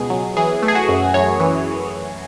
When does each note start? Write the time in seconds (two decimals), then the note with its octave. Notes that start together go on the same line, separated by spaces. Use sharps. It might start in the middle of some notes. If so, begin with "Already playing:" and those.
Already playing: C#2 B2 G#4
0.10 F#3
0.37 E3 G#4
0.62 A3
0.68 G#4
0.75 F#4
0.89 F#2
1.14 F#2 C#5
1.40 E3